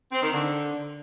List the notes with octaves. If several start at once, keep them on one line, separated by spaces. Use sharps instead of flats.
C4
D#3
D3